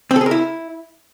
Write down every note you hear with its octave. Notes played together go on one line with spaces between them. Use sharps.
C4
A4
G#4
A#4
E4